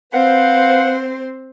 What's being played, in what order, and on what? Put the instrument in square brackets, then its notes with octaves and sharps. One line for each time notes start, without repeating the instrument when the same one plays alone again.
[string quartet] C4 C5 [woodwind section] B4 F5 F#5